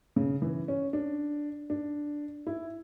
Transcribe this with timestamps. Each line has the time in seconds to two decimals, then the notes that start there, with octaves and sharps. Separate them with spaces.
0.16 C#3
0.42 E3
0.68 C#4
0.93 D4
1.70 D4
2.47 E4